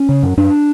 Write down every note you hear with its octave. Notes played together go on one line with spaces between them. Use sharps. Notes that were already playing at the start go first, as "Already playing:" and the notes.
Already playing: C#4
C#3
F#2
F#2 D4